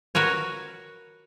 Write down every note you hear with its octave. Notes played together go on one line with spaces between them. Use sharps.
F#4 A#4 B4 C#5